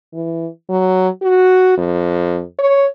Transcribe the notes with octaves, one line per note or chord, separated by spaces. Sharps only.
E3
F#3
F#4
F2
C#5